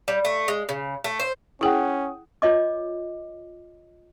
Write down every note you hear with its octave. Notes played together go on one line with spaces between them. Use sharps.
G3
A3
G#3
C#3
A3
C5
C#4 E4 G#4 F#5 G5 D#6
F4 C#5 D#5 D6